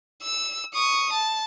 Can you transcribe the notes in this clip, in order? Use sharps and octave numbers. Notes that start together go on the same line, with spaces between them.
E6
C#6 D#6
A5